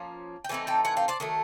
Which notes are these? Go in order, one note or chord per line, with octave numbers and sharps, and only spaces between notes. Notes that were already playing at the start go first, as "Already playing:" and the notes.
Already playing: F3 A#3 C#4
G5
E3 A3 C4 D#4 G#5
G5 A5
F#5 G#5
F5 G5
C5 D5
D#3 F#3 A3